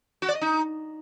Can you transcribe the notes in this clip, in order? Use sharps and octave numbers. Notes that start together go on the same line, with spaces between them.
F#4
D5
D#5
D#4